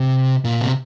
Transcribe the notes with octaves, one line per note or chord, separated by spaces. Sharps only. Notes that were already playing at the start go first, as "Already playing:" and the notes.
Already playing: C3
A#2
C3